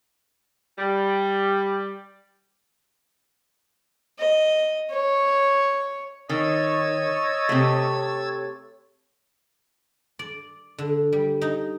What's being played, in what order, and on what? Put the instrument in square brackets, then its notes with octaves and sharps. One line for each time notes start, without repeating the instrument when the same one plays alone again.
[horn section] G3
[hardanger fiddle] D#5
C#5
[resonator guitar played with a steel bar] D#3 [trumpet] C#5 [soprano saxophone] D#5 [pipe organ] E6 G#6 A6
[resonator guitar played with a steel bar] C3 A3
[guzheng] D5
D3
G3
D#4